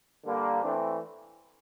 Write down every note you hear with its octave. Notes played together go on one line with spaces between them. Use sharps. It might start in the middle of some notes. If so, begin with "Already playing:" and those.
D3 G3 A#3
E3 A3 C4 D4